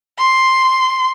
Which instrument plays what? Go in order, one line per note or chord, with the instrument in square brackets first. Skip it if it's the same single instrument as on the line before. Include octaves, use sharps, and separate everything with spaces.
[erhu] C6